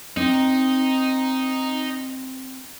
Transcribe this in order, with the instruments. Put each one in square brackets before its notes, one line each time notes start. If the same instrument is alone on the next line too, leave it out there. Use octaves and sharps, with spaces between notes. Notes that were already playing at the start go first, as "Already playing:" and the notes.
[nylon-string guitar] C4 D4 D#5 [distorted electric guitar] D#4